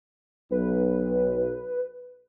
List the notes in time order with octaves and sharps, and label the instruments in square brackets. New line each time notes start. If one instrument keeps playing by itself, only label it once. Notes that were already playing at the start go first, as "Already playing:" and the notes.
[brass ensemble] B1 [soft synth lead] B4